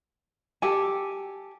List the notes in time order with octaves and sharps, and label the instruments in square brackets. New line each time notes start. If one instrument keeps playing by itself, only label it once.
[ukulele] G4 A4 G#5